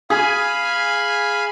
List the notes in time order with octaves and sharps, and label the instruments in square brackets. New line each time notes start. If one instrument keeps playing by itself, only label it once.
[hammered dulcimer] G#4 [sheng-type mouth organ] F5 G#5 B5